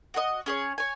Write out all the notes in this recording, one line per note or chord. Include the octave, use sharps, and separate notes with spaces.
F#4 B4 D#5
C#4 G#4 C#5
C#5 G#5